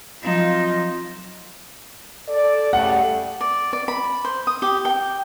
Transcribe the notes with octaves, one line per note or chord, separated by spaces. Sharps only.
F3 F#3 C4 D#4 F4 E7
A4 D5
C#3 G3 A3 F#5
D5
D5
B5
C5
D#6
G4
G5